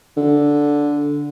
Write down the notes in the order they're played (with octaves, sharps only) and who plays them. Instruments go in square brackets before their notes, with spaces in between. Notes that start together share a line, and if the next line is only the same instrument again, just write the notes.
[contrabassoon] D3